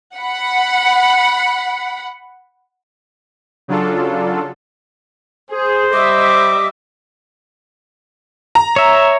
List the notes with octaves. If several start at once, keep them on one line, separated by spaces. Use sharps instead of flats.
F#5 B5
C#3 F#3 D4 F4 A4
G#4 C5
G3 D#5 E5 D6
A#5
C#5 E5